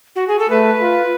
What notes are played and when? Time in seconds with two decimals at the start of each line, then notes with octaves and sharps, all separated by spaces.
0.16 F#4
0.28 G#4
0.39 A4
0.50 A3 B4
0.82 F4